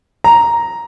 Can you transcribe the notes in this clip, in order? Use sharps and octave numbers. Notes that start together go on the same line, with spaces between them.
A#5